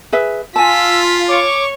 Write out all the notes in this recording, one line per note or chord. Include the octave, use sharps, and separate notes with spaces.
G#4 B4 E5
F4 G#5 A5 E6 B6
C#5 C#6 D6